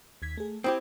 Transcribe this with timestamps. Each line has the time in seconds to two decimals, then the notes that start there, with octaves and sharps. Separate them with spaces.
0.22 D#2 G#6 B6
0.38 A3 G#4
0.64 C4 E4 G4 G5 D#6